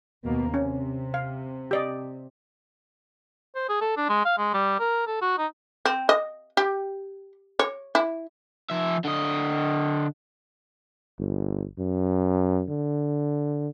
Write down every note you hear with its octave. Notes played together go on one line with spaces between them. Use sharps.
D#2 B2 A#3
C3 C#4
F5
G4 D5 D#5
C5
G#4
A4
D4
G#3
F5
G#3
G3
A#4
A4
F#4
D#4
C4
D#5
G4
C#5
E4
F3 E5
D3 D#5
G1
F#2
D3